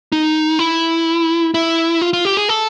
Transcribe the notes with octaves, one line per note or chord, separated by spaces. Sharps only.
D#4
E4
E4
F4
F4
G4
G#4
A4